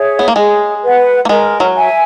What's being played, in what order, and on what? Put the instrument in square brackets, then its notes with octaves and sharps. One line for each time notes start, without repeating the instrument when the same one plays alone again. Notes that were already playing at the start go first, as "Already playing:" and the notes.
Already playing: [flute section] G#4 C#5 E5
[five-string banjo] B3
A#3
[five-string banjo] G#3 [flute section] G#4
[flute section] B4 F#5
[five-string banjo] A#3
[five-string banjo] G#3 [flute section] A#4
[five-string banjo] F#3
[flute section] E5 G#5